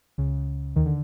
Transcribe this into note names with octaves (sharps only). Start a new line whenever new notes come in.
C#2 C#3
D#2 D#3
D3